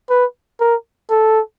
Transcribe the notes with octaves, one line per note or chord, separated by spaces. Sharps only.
B4
A#4
A4